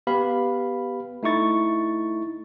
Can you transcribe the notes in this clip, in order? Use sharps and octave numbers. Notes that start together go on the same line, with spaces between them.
B3 G4 B4 F5 B5
A3 D#4 E4 C#6 A6